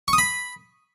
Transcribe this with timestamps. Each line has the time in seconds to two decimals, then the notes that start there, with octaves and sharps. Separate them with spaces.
0.08 C#6
0.13 D#6
0.18 B5